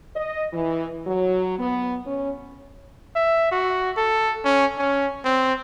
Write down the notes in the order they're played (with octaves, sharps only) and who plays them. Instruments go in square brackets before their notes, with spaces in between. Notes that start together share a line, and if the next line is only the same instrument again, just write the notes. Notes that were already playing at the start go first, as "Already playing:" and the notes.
[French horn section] D#5
E3
F#3
B3
C#4
[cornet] E5
F#4
A4
C#4
C#4
C4